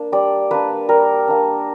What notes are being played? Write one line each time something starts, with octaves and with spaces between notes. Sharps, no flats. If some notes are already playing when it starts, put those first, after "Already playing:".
Already playing: A#3 D4
G3 D5
A#3 D4 B4
G3 A#4
A#3 D4